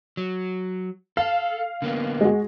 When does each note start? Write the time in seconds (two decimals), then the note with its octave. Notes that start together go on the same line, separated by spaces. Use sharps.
0.17 F#3
1.17 A4 F5
1.82 D3 A#3 B3
2.21 G#3 F#4